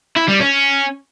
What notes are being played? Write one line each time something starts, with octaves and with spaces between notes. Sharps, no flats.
E4
G3
C#4